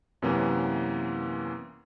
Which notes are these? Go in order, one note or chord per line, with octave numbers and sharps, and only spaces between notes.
F#2 C3 E3 A#3 B3 C#4